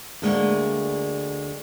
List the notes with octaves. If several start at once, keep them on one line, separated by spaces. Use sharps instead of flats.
D2 G#3 A#3 D4